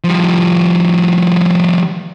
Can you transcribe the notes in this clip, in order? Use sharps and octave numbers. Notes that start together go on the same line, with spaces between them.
F3 G3